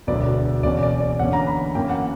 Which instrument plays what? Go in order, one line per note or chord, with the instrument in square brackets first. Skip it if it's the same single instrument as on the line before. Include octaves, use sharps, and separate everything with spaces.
[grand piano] E1 D2 D3 F#3 B3 D5
E1 E2 B2 A#3 C#4 D5
D5
D5
E2 D3 A#3 C#4 F#5
A#5
B5
F#2 E3 A#3 C#4 G5
F#5